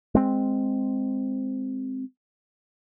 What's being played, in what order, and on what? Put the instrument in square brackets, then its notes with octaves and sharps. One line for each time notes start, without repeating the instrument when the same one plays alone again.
[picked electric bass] G#3 C4